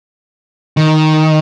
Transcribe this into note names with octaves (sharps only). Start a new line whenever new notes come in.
D#3